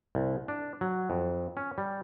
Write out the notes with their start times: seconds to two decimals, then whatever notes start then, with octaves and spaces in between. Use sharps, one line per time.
0.15 C2
0.48 D4
0.81 F#3
1.10 F2
1.57 C#4
1.78 G3